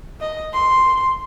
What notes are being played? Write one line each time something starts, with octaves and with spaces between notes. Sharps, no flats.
D#5
C6